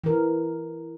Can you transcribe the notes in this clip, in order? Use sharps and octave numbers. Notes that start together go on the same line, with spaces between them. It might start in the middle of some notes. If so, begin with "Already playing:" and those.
E3 A#4